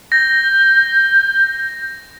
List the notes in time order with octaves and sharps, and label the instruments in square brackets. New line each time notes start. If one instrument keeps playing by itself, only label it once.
[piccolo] G6 [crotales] A#6